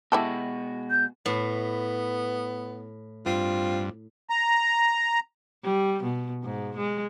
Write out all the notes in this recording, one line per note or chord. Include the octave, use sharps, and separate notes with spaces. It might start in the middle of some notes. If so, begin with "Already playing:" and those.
B2 G#3 E4 F#4 G4 A4
G6
A2 B3
G2 C4 F4
A#5
G3
B2
G#2
G#3